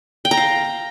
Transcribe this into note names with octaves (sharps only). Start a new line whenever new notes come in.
G5
A#5
F5